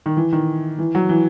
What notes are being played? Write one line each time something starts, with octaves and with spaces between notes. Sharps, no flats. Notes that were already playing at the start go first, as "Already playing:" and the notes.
D#3
E3
D#3
E3
F#3
E3